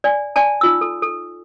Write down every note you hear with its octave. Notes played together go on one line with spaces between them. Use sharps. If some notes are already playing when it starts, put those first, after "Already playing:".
D5 G#5
D5 G#5 A5
D#4 F4 E6
A4
A4